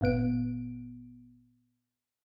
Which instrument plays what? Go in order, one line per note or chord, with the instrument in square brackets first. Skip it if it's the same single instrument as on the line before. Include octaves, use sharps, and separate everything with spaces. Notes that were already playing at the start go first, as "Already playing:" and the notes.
[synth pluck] G1 A#2 B3 D7